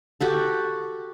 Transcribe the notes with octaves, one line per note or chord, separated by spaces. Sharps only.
F#4 G4 A4